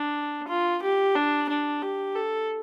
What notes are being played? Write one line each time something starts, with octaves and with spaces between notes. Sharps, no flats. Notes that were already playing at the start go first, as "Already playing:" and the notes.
Already playing: D4
F4
G4
D4
D4
G4
A4